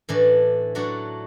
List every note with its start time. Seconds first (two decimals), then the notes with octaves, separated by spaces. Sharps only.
0.09 A2 E3 A3 D4
0.75 F#3 A3 D4 F#4